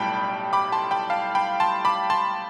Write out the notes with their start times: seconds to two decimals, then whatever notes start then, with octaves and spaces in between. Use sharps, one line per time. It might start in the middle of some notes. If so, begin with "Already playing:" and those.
Already playing: B1 A2 G3 G5 A5 B5
0.53 B5 D6
0.72 A5 C6
0.91 G5 B5
1.10 F5 A5
1.35 G5 B5
1.60 A5 C6
1.85 B5 D6
2.10 A5 C6